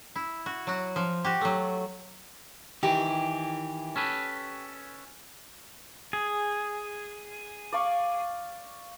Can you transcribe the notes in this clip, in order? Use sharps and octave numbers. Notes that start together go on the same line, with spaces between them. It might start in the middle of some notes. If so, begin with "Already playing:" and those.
E4
F#4
F#3 F#4
F3
F#4 G4
F#3 A3
D#3 E3 G4
C#4 A4 B4
G#4
D5 F5 C#6